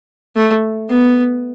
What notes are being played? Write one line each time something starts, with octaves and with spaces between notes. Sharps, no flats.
A3
B3